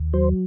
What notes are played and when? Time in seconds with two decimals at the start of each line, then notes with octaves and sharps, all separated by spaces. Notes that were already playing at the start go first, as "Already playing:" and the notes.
Already playing: D#2
0.13 F#3 C5